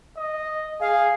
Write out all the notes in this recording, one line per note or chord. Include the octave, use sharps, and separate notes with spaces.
D#5
G#4 F5